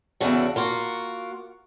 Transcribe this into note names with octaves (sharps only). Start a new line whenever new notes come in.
E2 C#3 D4 F#4 A4
A#3 F4 F#4